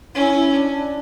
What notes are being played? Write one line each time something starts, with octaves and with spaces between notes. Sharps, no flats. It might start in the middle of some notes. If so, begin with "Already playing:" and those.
C#4 E4
E4
D4
D4